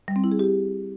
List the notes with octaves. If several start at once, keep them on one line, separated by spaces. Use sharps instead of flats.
G3
C4
E4
G#4
G4